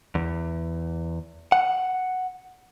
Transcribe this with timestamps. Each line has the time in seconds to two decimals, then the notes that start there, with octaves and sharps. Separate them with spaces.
0.15 E2
1.52 F#5